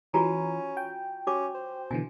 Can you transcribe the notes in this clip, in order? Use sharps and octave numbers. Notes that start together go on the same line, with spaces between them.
E3 C#4 F4 F#4 A#5
G5
C#4 F#4 D6
C5
B2 D3 E3 G#5